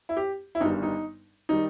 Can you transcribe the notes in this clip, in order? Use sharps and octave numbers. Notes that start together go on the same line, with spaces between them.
E4
G4
E4
G1 G2 D#3 G3 D#4
D#4
D#3 G3 D#4